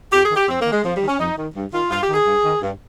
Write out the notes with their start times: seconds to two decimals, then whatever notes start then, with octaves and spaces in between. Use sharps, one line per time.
0.13 F2 G4
0.24 G#4
0.31 D#3
0.36 G4
0.48 F2 C4
0.61 A#3
0.66 D#3
0.72 G#3
0.84 F2 F3
0.96 G3
1.02 D#3
1.08 C#4
1.19 F2 D#4
1.38 D#3
1.56 G2
1.73 D#3 F4
1.91 G2 F4
2.02 G4
2.09 D#3 G#4
2.27 G2
2.45 D#3
2.62 G2